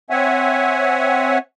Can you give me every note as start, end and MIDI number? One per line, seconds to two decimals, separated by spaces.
0.10 1.38 60
0.10 1.38 73
0.10 1.38 76
0.10 1.38 78
0.10 1.38 80